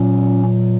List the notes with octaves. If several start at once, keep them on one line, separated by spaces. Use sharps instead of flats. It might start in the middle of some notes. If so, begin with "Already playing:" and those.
Already playing: A#2 F#3 C#4